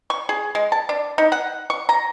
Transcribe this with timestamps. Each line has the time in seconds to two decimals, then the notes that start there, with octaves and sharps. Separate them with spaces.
0.10 C#6
0.29 G#4
0.55 G#3
0.72 A5
0.89 D4
1.18 D#4
1.32 F#5
1.70 C#6
1.89 A#5